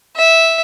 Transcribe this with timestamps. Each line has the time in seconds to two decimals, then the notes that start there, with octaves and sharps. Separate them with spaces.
0.17 E5